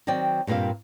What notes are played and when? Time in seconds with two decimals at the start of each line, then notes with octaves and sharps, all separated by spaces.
0.07 D#3 F#3 C4 D5 G5
0.47 G2 A#2 A#3 C4 F5